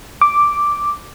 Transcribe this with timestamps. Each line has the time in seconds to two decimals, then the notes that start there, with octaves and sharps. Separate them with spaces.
0.21 D6